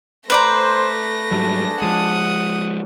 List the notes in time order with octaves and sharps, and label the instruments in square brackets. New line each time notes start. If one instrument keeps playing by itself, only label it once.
[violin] A3 A#6 [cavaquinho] B4 D5 A#5 [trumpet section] C5
[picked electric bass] G#2 F#3 G3 [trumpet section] D4 G#4 A5
[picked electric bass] F3 G#3 [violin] F#5 D#6